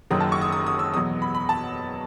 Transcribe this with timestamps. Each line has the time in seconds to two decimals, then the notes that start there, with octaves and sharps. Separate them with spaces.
0.11 F#1 F#2 D#3 F#3 D#6
0.20 A5
0.32 C#6
0.42 D#6
0.52 D#6
0.67 D#6
0.79 E6
0.94 E2 B2 F#3 D#6
1.22 B5
1.35 B5
1.49 A5